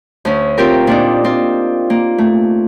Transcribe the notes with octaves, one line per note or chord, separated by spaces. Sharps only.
D2 C#4
C4 F4 G4 A#4
A#2 D4 D#4
C4 F4
A#3
A3